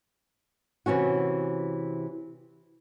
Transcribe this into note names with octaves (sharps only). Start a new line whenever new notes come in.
C3 E3 C#4 F#4